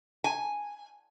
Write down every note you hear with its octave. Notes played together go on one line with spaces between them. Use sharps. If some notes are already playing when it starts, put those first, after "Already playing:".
G#5